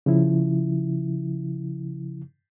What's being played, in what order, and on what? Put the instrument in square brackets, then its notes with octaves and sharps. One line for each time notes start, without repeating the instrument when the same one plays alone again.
[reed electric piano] C#3 F3 E4